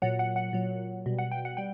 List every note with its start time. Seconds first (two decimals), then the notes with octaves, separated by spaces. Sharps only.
0.02 A#2 F#3 F#5
0.19 F#5
0.36 F#5
0.53 A#2 F#3
1.06 B2 G3
1.19 F#5
1.31 G5
1.45 F#5
1.57 G3 G5